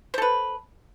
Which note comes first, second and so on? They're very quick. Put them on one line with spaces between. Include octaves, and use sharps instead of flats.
C5 A4 B4